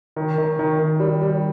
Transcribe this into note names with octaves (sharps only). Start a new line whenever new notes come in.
D#3
D#3
D#3
D#3
G3
G3